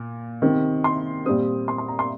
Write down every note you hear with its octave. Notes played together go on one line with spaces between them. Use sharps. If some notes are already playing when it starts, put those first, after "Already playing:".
Already playing: A#2
C3 D#3 C4
C6
A#2 G3 C4 D#6
C6
C6
A#5
C6